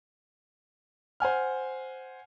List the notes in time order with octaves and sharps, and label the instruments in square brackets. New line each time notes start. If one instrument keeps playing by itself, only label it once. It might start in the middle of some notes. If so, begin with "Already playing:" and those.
[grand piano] C5 F#5 G#5 F6